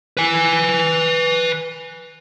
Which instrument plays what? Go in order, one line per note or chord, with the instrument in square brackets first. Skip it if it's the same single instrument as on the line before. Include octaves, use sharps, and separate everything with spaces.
[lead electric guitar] B4 G#5